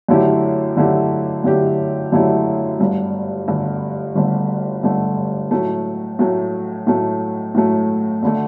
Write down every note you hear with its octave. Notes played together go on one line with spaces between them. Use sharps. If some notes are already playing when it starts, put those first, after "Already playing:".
F#2 D3 A3 E4 G4
F#2 D3 A3 E4 G4
F#2 D3 A3 E4 G4
F#2 D3 A3 E4 G4
G1 G2 D3 A3
G1 G2 D3 A3
G1 G2 D3 A3
G1 G2 D3 A3
A2 F#3 A3
A2 F#3 A3
A2 F#3 A3
A2 F#3 A3
D2 D3 A3